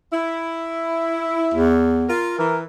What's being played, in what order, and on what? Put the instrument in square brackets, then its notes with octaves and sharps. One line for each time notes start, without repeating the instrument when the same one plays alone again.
[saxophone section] E4
[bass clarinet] E2
[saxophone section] F4 A#4
[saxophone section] E3 [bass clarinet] A#4